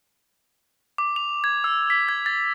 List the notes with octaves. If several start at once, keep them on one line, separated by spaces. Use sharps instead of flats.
D6
F7
G#6
E6
B6
G#6
A6